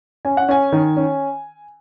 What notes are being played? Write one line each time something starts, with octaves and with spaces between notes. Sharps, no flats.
C#4 G#5
F#5
C#4 G#5
D#3
C#4